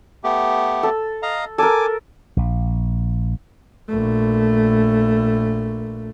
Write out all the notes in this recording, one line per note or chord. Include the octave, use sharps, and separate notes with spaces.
A3 B3 G4
A4
D#5 F5 A#5
A4 A#4 G#5 D6
A#1
A#1 A3